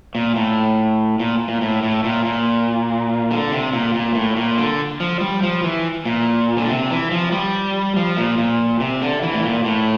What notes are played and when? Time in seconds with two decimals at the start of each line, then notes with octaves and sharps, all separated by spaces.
0.15 A#2
0.36 A2
1.19 A#2
1.48 A#2
1.61 A2
1.83 A2
2.04 A#2
2.25 A#2
3.31 D3
3.52 C3
3.73 A#2
3.94 A#2
4.15 A2
4.37 A#2
4.58 D3
5.00 F3
5.21 G3
5.43 F3
5.64 E3
6.05 A#2
6.57 D3
6.69 C3
6.90 E3
7.11 F3
7.32 G3
7.96 F3
8.17 A#2
8.38 A#2
8.80 C3
9.02 D3
9.22 E3
9.34 A2
9.44 A#2
9.65 A2